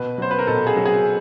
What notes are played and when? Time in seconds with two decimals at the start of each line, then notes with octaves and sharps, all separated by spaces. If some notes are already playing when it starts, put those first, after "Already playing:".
Already playing: B2 B4
0.18 F#3 C5
0.31 B4
0.39 A#4
0.47 B2 A4
0.67 G#4
0.76 F#3
0.86 G#4